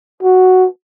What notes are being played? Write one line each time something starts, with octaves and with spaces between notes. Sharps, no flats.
F#4